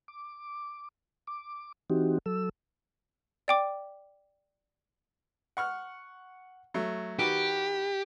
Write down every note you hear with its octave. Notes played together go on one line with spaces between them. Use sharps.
D6
D6
E3 C4 D#4 F#4 G4
F#3 A4 E6
D5 G5 D6
F#5 C#6 F6
F#3 A3
D#3 F#4 G4 B4